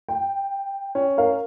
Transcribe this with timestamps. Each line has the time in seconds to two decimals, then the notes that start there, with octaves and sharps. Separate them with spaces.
0.09 G5
0.95 C#4
1.18 A#4 F5